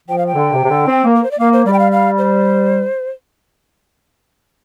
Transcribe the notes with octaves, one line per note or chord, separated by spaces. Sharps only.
F3 G5
F5
G5
D3
C3
C3
D3
C4
A#3
A#4
C5
D5
A#3 F5
C5
G3 D5
G5
F5
F5
C5